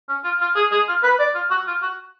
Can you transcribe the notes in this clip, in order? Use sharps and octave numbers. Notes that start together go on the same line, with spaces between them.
C#4
F4
F4
G#4
G#4
F4
B4
D5
F4
F#4
F4
F#4